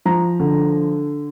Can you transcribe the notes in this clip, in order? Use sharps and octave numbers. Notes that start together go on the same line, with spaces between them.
F3 A#5
D3